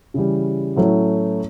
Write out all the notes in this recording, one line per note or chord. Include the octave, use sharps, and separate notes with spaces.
C#3 E3 G3
A2 F#3 A3 C#4